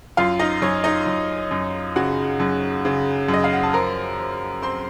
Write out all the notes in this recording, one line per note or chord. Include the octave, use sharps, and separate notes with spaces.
F#2 F4 F5
D#4 D#5
F#2 C#4 C#5
D#4 D#5
F#2
F#2
C#3 F#4 F#5
F#2
C#3
F#2
D#5
F5
F#5
A5
F3 A#4 A#5
F3
C4 C5 C6